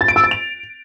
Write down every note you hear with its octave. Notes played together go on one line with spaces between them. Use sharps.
A6
D7
E6
A6
F7